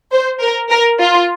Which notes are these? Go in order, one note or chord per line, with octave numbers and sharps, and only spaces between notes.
C5
A#4
A#4
F4